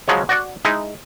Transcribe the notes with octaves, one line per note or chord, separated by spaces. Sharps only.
C#3 F3 F#3 G#3 C#4
F#4 D5 F#5
G#3 D#4 E4